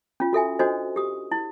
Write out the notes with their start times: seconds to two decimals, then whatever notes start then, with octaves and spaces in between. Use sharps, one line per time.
0.20 C#4 F4
0.33 F#4 A4 E5 G#5
0.59 D4 F#4 A4 C5 D#5
0.96 G4 D#6
1.32 E4